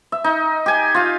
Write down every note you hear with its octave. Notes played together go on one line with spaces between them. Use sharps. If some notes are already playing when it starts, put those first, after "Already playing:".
E5
D#4
G4 G#5
F4 F5